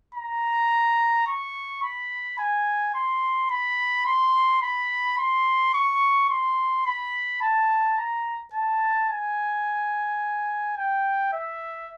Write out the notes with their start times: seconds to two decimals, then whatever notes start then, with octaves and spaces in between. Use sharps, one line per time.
0.15 A#5
1.27 C#6
1.82 B5
2.39 G#5
2.95 C6
3.50 B5
4.06 C6
4.62 B5
5.18 C6
5.74 C#6
6.30 C6
6.86 B5
7.42 A5
7.98 A#5
8.54 A5
9.10 G#5
10.77 G5
11.33 E5